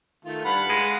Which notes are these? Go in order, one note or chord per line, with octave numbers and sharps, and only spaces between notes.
D#3 A3 F4
G2 F5 F#5 B5
G#3